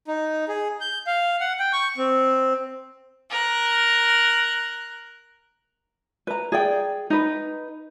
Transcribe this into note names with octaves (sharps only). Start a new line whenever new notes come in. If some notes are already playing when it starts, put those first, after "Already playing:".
D#4
G#4
G6
F5
F#5
G5
C#6
C4
A#4 F#6
B4 A#5
G#4 D5 G5
D#4 B4